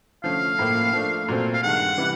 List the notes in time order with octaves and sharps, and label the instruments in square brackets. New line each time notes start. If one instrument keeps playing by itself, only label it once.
[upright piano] D3 F3 A3 C#4 [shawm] F5
[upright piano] A2 F3 A#3
F3 A3 D4
A#2 F#3 A3 C4
[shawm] F5
[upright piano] G2 D#3 G#3 [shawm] F#5
[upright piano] C3 E3 G3